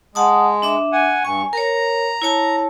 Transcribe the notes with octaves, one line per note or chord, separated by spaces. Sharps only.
G#3 F#5 A5 D#6
D4 E5 D6
F#5 G#5
G2 G#5 C#6
A#4 C#5 A#5
E4 C#5 A5